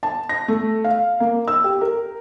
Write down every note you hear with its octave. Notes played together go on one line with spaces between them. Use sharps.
A5
A#6
A3
F5
A#3
E6
G4
A#4